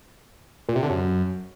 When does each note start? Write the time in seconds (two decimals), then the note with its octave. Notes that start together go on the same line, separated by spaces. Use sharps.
0.69 A#2
0.76 C3
0.83 D3
0.90 F#2